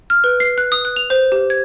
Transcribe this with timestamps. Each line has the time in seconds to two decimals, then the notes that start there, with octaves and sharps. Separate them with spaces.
0.10 F6
0.24 B4
0.40 C7
0.58 F#6
0.72 D#6
0.85 F#6
0.96 F7
1.10 C5
1.32 G4
1.50 G#6